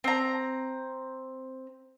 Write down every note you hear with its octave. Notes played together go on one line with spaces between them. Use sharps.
C4 A#5